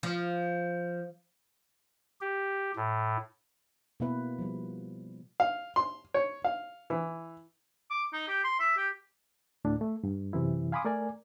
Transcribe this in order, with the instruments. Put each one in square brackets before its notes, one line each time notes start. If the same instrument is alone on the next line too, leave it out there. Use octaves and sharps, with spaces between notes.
[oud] F3
[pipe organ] G4
A2
[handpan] B2 A#3 B3 E4 B4
F3 G3
[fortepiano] F5
C6
C#5
F5
E3
[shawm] D6
D#4
G4
C6
E5
G4
[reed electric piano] D2 A2 D4
A3
G2
F#2 C3 E3 E4
F5 G#5 B5 C6 D6 D#6
A3 A#4 D5 G#5